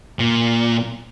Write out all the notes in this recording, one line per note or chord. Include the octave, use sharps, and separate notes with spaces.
A#2